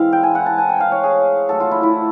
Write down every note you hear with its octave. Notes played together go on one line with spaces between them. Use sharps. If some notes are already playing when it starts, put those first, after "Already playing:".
Already playing: E3 G#3 C4 E4 F5
G5
G#5
F#5
A5
G#5
G5
F5
C#5
G#4
D3 F#3 A3 A4
F4
E4
E4